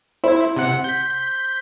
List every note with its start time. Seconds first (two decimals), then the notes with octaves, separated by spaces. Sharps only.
0.24 E4 C5
0.56 C3 F#5 C#7
0.84 G6 B6